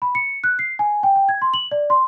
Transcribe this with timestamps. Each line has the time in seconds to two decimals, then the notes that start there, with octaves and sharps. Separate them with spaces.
0.02 B5
0.15 C#7
0.44 F#6
0.59 C7
0.79 G#5
1.03 G5
1.16 G5
1.29 G#6
1.42 C6
1.54 F#7
1.71 D5
1.90 C6